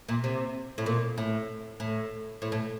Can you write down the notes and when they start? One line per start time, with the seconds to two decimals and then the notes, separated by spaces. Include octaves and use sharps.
0.09 A#2
0.24 C3
0.78 A2
0.86 A#2
1.18 A2
1.80 A2
2.42 A2
2.52 A2